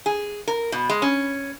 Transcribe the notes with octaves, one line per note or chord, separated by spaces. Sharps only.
G#4
A#4
B2
G#3
C#4